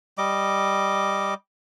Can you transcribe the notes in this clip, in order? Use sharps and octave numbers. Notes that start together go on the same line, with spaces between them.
G3 D#5 D6